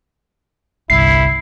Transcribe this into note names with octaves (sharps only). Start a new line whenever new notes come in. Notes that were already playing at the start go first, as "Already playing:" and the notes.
G1 C2 E4 C7